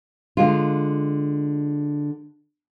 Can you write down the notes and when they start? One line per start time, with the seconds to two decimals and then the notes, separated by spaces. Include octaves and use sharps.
0.37 D3 G#3 F4